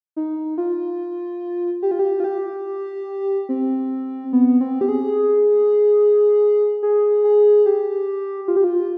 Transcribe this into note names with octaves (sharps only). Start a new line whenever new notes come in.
D#4
F4
G4
F4
G4
F4
G4
C4
B3
C4
G4
G#4
G#4
G#4
G4
F4
G4
F4